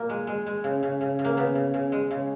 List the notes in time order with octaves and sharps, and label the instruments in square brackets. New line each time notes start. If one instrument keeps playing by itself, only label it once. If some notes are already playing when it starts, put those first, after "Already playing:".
Already playing: [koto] A#2 A#3
G#3
G#3
G#3
C#3
C#3
C#3
C#3
A#3
C#3 B3
C#3
C#3
G#3
C#3